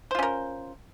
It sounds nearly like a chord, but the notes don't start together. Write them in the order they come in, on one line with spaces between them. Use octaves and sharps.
C5 F4 C#4 A#4